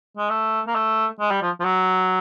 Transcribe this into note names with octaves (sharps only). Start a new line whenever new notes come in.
G#3
A3
A#3
A3
G#3
G3
F3
F3
F#3